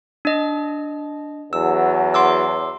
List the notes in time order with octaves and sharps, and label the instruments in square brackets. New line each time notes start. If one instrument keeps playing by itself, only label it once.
[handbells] D4 D#5
[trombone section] E2 F#3 [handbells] E6
[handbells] C6 D6 E6